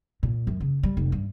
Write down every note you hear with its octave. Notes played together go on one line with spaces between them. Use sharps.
A#2
F#2
C#3
G3
F1
G2